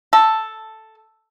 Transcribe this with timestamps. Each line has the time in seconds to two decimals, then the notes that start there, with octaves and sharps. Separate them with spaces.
0.13 A4